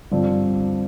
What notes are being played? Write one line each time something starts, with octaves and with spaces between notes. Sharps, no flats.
G2 D3 F3 C4